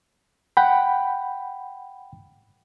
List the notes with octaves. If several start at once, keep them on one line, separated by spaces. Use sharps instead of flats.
F#5 G5 B5